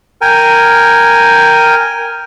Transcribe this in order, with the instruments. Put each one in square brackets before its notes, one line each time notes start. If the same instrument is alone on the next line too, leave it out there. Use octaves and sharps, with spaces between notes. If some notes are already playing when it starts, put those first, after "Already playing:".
[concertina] A#4 G5 G#5